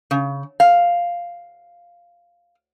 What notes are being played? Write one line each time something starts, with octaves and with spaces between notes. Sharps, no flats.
C#3
F5